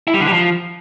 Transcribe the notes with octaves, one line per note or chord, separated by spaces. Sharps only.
E4
G3
D3
G3
F3